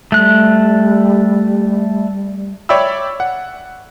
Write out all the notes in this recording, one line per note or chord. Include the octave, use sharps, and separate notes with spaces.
G3 A3 F#6
C#5 D5 E5 G5 B5 E6
F#5